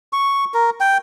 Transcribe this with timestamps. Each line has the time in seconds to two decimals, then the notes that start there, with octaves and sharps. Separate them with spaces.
0.13 C#6
0.54 A#4
0.80 G5